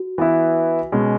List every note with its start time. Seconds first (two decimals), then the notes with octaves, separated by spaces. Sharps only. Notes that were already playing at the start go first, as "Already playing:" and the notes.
Already playing: F#4
0.18 E3 B3 E4
0.92 B2 G#3 C#4